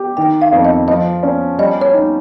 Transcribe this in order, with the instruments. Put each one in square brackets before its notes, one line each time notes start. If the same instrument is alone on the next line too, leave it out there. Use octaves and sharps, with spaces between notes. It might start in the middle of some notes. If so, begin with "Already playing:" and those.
Already playing: [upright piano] G4
[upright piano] D#3 [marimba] G5
[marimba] F5
[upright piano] F2
[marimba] D#5
[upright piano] F3 [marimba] D#5
[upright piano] C#4
[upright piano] G3 [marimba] D#5
[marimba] C#5
[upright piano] D#4